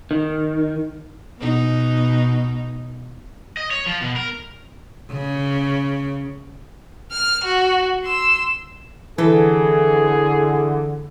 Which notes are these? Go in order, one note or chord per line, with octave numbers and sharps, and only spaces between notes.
D#3
B2 B3 D#4
D#5
C#5
F3
B2
A#4
C#3
F6
F#4
C6 E6
D3 E3 G#4 A4 B4